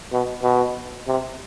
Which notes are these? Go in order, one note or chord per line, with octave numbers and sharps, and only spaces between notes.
B2
B2
C3